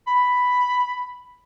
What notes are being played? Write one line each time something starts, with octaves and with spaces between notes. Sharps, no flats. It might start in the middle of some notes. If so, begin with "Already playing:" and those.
B5